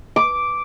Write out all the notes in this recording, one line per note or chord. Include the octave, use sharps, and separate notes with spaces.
D6